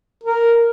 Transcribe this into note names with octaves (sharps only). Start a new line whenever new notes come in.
A#4